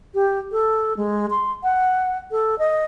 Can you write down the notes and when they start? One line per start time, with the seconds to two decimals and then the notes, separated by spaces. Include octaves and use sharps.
0.14 G4
0.52 A4
0.97 G#3
1.30 C6
1.64 F#5
2.31 A4
2.59 D#5